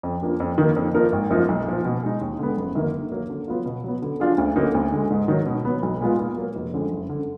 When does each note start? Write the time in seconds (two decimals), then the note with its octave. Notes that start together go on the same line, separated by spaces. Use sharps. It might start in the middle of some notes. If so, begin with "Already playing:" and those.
0.03 F2
0.22 F3 A#3 D4
0.40 F2
0.58 D#3 A#3
0.76 F2
0.94 F3 A#3 D#4 A#4
1.12 G#1
1.30 F#2 F3 A#3 D#4
1.48 B1
1.67 A#2 F3
1.85 B2
2.03 G#3 D#4
2.21 D#2
2.39 D3 G#3 B3
2.57 F#1
2.75 F#2 D#3 A#3
2.93 D3
3.12 F#3 A#3
3.30 D3
3.48 F#3 B3 F4
3.66 B2
3.84 F#3 B3
4.02 D3
4.20 F#3 D4 F4 G#4
4.38 D2
4.56 D3 F#3 A#3 D#4
4.75 D2
4.92 D3 G#3
5.11 G#2
5.28 D#3 F#3
5.46 B2
5.65 F#3 B3
5.83 B1
6.01 A#2 G#3 B3 F4
6.19 A#2
6.37 F#3 A#3
6.55 F1
6.74 F2 D3 G#3
6.91 F#1
7.09 D3